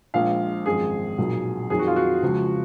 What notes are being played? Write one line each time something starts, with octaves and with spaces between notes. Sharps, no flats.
A#1 A#2 F3 G#3 F5
G#1 F#2 F3 G#3 G#4
B1 A#2 F#3
F2 D#3 F#3 G#4
F#4
F4
F#4
C#2 C#3 F3 G#3